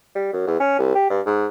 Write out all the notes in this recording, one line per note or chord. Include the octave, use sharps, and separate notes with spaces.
G3
F#2
E2
C#4
C2
G4
G2
G#2